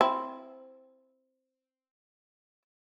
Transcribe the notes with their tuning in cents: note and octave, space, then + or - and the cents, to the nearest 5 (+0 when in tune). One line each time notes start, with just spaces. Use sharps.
C4 +0 E4 +0